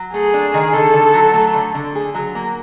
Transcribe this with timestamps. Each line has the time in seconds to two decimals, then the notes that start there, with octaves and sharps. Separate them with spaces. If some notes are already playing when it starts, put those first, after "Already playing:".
Already playing: F#3
0.13 A3 G#4
0.34 D4
0.54 D#3
0.73 D3 A4
0.94 D3
1.14 F#3
1.34 A3
1.54 D3
1.75 D3
1.95 G#4
2.15 F#3
2.35 A#3